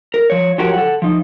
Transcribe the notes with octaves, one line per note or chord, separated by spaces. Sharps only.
A#4
F3 C#5
F3 F#3 F#4 G4 A#4
A4 F#5
F3 D#4